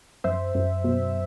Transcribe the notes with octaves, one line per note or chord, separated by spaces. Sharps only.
F#2 C5 E5
F#2
B2